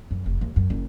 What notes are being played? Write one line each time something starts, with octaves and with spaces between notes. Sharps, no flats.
F#2
F1
D#2
F#2
F#1